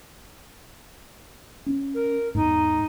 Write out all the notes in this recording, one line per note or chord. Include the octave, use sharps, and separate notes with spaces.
C#4
A#4
E2 G#2 D#4